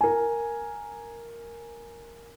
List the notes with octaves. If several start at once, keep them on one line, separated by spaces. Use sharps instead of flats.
A#4 G#5